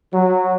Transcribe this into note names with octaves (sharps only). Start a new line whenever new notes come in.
F#3